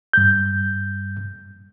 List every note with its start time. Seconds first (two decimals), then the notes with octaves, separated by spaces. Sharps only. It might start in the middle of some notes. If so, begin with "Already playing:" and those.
0.13 G2 G6